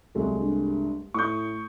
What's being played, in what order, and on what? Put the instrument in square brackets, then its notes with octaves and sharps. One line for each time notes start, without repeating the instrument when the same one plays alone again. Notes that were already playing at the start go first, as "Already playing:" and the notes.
[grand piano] C2 G#3 A3 [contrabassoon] F#3
[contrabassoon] G2
[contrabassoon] A2 [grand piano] C#6 D#6 G6